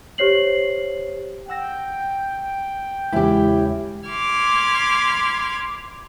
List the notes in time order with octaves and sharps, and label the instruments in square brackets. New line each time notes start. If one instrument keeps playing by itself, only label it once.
[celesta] G4 C5 C#5 C7 F#7
[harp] F#5 E6 A#6 [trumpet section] G5
[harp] E2 C#3 E3 [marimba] G#3 [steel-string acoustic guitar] E4 G4
[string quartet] B5 C6 D6 F6 G#6